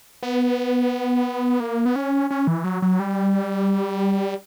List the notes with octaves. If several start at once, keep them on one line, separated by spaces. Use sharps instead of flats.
B3
A#3
B3
C#4
C#4
E3
F#3
F#3
G3